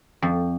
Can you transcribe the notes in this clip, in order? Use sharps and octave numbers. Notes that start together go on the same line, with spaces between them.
F2